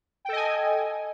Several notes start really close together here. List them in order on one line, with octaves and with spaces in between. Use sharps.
G5 A4 D#5 G#5